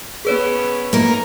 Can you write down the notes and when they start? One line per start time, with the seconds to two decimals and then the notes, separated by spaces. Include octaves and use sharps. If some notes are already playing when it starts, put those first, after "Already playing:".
0.25 B3 C#4 G#4 B4 C#5
0.93 A#3 D#4 A#4